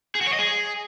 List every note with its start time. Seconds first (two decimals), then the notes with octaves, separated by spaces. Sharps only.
0.15 G#4
0.21 F#4
0.27 C#5
0.33 D#5
0.39 G#4